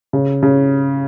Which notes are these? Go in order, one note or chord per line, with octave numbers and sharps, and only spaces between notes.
C#3
C#3